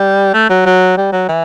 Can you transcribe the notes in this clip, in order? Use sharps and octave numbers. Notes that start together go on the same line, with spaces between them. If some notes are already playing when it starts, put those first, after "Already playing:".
Already playing: G3
A3
F#3
F#3
G3
F#3
E3